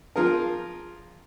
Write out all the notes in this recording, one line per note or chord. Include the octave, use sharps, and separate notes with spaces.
F3 F4 G#4 A#4